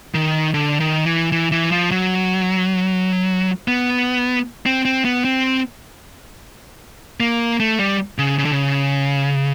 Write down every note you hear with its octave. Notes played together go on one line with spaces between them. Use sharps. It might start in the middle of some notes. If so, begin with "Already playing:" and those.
D#3
D3
D#3
E3
E3
E3
F3
F#3
B3
C4
C4
B3
C4
A#3
A3
G3
C#3
C#3
D3
C#3